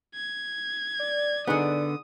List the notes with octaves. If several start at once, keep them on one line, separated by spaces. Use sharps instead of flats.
G#6
D5
D3 B3 D#4 G#4 F#5 D#6